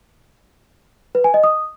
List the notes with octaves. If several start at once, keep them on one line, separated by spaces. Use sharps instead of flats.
B4
G#5
D#5
D#6